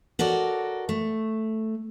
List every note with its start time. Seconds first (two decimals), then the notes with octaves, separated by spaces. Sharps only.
0.19 F#4 A4 A#4 C#5 D5
0.89 A3